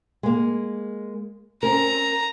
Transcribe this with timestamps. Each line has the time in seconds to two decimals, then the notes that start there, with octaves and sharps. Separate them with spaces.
0.23 G#3 A#3
1.63 C4 C#4 A#4 A#5